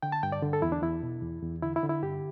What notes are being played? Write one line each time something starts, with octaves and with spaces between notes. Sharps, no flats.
D3 G5
A5
G2 G5
D5
D3
A4
E2 E4
D4
E2 E4
B2
E2
E2
D3 E4
E4
D3
E4
G2 G4